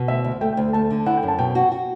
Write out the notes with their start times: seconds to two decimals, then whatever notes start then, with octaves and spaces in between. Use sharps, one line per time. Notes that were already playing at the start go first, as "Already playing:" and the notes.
Already playing: B2
0.08 D2 E5
0.24 D2
0.41 A3 G5
0.53 G5
0.57 D2
0.73 A3 A5
0.91 D3
1.06 E4 F#5
1.17 G5
1.23 F#2
1.28 A5
1.39 B2 G5
1.55 F#4
1.72 F#4